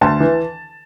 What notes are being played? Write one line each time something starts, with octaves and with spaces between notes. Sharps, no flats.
D2 A5
E3